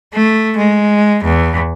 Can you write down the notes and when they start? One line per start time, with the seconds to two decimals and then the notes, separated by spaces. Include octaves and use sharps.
0.14 A3
0.58 G#3
1.25 E2